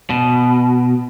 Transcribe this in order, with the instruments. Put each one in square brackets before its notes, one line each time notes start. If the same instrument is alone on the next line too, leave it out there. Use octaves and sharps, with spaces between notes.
[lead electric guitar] B2